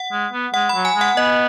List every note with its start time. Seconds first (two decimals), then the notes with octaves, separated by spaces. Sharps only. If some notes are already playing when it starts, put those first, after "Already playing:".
Already playing: F#5
0.12 G#3
0.33 B3
0.54 G#3 F#5
0.69 B5
0.75 F#3
0.85 G#5
0.95 G#3
1.01 F#5
1.16 B3 D#5